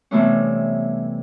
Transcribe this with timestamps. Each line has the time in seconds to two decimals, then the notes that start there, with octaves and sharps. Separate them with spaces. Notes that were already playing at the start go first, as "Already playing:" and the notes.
0.11 C3 E3 G3 A3 B3 C#4